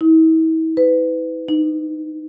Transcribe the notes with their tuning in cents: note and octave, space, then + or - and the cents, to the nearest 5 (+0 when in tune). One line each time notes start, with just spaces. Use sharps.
E4 -40
B4 +30
D#4 -10